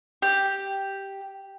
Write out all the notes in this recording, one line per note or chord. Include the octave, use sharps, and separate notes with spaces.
G4